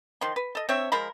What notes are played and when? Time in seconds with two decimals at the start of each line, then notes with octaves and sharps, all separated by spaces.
0.21 D#3 F3 C6
0.36 B4
0.55 A4 D#5
0.69 C4 D4 C#5 E5
0.92 F3 G#3 A#4 B5